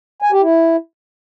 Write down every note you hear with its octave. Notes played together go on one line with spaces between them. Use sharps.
G#5
G4
E4